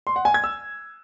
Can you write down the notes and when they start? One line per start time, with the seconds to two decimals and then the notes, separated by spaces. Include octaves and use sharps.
0.07 C6
0.16 F#5
0.25 G#5
0.34 G#6
0.44 E6